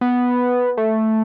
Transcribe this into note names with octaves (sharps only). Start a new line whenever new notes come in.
B3
A3